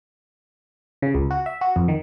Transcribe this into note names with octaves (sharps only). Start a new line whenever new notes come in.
C#3
C#2
F#4
E5
F#4
F2
D#3